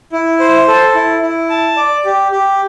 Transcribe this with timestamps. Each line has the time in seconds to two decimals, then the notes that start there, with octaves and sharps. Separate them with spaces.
0.12 E4
0.40 C5
0.68 A4
0.95 E4
1.22 E4
1.50 A5
1.77 D5
2.05 G4
2.32 G4